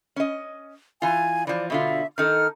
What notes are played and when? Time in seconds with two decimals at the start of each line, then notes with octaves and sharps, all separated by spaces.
0.16 C#4 D#5
1.02 E3 F4 G#5
1.47 E3 F3 D5
1.70 B2 D3 F4 E5
2.18 D#3 D#4 A4 F6